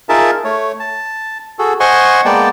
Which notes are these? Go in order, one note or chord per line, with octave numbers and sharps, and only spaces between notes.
D#4 F4 G#4 A#4 E5 A5
A3 C#5
A5
F#4 G#4 A4
C5 D#5 F#5 G#5 C6 C#6
G#3 A#3 B3 D5 G5 A5